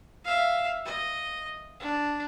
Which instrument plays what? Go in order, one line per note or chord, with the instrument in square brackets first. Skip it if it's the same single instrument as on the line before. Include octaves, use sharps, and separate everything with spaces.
[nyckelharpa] E5 F5
D#5
D4